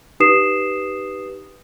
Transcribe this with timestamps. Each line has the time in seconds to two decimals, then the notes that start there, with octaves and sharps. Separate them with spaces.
0.20 D#4 G4 B4 D#6 C7 E7